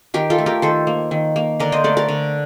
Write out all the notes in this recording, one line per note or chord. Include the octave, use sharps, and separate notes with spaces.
D#3 G4 A#4
F4 A4
A3
G4 A#4
D#3 A4 C5
A#3
D#3
A#3
D3 A#4 D5
C5 D#5
A3 A#4 D5
A#4 D5
D3